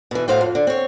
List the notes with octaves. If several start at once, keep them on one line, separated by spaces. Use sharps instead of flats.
B2 E3
A2 F#4 C5 F5
F2
D3
C4 C#5